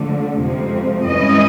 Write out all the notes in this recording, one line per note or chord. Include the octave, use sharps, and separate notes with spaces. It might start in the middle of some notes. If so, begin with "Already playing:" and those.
Already playing: D3 F3 A3
F2 C3 F3 G#3 C4
G2 E3 G#3 C#4 E4 D#5